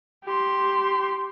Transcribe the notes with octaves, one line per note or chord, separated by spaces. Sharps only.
G4 C6